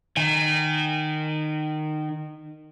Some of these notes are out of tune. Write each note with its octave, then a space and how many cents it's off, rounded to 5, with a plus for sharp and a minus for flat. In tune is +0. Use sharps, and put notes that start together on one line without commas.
D#3 -20 G#5 -35